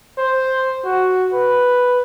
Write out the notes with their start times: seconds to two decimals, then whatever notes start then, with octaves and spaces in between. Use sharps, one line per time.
0.18 C5
0.85 F#4
1.33 B4